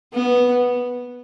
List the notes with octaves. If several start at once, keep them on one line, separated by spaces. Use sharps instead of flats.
B3